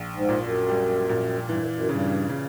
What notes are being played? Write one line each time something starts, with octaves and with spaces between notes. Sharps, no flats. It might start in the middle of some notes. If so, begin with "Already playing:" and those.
Already playing: A#1
G#2
A#2
F#2
G3
A#2
G2 E3
F#2
F#2
G2 C#3
C#3